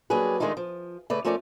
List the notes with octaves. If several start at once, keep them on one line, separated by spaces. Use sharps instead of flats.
F#3 G3 A#3 D4 G#4 B4
D#3 G#3 A3 D4 D#4 F4
F3
C#3 A3 B4 D5
F3 A3 C#4 A#4 C#5 D5